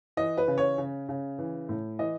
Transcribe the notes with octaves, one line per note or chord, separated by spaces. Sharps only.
E3 D#5
B4
C#3
C#5
C#3
C#3
E3
A2
E3 D#5